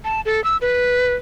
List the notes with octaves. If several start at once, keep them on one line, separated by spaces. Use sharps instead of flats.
A5
A4
E6
B4